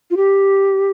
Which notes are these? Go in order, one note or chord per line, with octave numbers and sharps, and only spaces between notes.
F4
G4